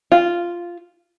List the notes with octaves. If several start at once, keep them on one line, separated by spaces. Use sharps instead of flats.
F4